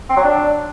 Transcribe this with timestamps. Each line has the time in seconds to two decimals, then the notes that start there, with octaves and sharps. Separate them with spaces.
0.09 C4
0.17 F#3
0.24 D4